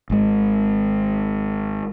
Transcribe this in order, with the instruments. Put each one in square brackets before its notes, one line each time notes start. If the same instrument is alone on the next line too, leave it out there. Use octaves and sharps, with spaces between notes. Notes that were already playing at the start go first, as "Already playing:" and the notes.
[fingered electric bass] G#1 G#3